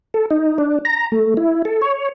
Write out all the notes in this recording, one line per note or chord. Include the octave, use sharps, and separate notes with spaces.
A4
D#4
D4
A#5
A3
E4
A4
C#5